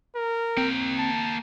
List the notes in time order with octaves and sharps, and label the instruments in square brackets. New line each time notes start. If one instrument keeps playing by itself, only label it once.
[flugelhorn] A#4
[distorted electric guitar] A#3 G5 [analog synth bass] C4
[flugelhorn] A5